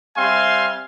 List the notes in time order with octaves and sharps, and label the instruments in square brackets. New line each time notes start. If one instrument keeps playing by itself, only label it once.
[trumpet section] G3 C4 E5 F5 G#5 C6